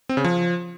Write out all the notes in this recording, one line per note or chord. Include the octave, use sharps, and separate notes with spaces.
C4
C#3
F3